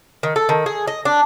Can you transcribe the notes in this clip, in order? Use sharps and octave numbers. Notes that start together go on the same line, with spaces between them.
D#3
A4
D#3
G#4
D#5
D4